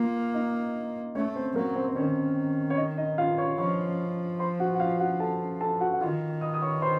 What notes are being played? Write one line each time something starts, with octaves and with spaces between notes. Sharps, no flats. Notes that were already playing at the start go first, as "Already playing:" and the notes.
Already playing: A#3 F4
D#4 D#5
A3 C#4 C#5
C4 C5
F#3 A#3 A#4
C4 C5
C5
D#3 C#4 C#5
C#5
D#4 D#5
D#4 D#5
F4 F5
C#5 C#6
F3 C#5 C#6
C5 C6
F#4 F#5
F#5
F4 F5
F#4 F#5
A4 A5
A4 A5
F#4 F#5
F#5
D#3 F4 F5
D#5 D#6
D#6
C#5 C#6
C5 C6